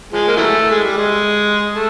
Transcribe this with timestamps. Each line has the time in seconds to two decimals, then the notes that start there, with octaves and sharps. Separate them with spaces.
0.13 F3 G#3
0.27 A#3
0.36 E3 F#3 A3
0.70 G#3
0.84 G3
0.98 G#3
1.74 A3